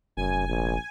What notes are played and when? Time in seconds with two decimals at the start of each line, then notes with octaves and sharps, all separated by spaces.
0.17 F1 F#2 G#5
0.47 A#1